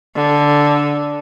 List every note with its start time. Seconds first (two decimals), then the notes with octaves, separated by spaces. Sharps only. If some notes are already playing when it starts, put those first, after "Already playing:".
0.16 D3